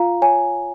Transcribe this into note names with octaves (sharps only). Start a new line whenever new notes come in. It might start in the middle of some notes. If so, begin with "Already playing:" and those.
Already playing: F4 F5 A#5
C#5 G#5